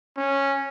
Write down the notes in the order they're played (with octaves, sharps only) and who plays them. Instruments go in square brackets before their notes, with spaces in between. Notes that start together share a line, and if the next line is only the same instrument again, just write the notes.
[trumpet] C#4